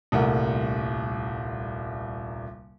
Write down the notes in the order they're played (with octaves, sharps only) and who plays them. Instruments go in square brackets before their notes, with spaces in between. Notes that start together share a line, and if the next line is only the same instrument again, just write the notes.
[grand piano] D#1 C2 A3 A#4 F#5